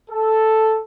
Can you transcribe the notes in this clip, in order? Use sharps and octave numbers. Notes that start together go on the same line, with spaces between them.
A4